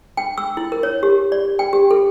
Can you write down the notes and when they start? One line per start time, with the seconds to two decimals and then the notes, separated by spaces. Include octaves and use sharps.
0.17 G5
0.38 E6
0.57 E4
0.72 A#4
0.83 C#5
1.03 G4
1.32 D5
1.59 G5
1.73 G4
1.91 A4